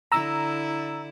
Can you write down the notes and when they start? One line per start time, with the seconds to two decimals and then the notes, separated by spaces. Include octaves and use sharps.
0.12 D3 E4 A#5 E6